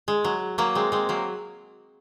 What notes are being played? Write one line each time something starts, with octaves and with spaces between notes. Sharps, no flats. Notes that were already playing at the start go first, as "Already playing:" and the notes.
G#3
F#3
F#3 A#3
G#3 C4
G#3 C4
F#3 A#3